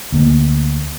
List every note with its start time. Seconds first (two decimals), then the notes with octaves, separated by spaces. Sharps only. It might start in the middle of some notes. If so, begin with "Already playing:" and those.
0.12 D2 A#3